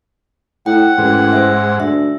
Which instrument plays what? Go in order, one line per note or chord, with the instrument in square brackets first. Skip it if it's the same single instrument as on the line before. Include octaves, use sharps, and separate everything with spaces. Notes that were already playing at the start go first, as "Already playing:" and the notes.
[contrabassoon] A2 [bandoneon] F#5 [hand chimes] G5
[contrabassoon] A1 [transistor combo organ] G#2
[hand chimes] C5 E5
[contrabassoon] D2 [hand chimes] E5